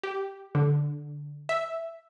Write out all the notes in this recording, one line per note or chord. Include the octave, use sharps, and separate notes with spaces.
G4
D3
E5